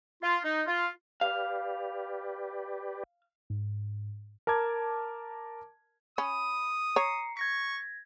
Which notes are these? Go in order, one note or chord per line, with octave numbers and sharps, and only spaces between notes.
F4
D#4
F4
G4 B4 D5 F5
G#2
A#4 A5 D6 G#6
C#4 B5 D#6
C#5 A#5 C7 C#7
C#6 G#6 A#6 B6